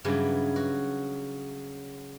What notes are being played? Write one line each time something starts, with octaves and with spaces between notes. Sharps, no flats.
G2 C#3 E3 F#3
F#4